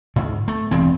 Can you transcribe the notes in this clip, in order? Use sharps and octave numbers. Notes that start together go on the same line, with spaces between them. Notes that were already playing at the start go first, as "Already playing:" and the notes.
D2 G#2
A3
E1 E2 G2 C4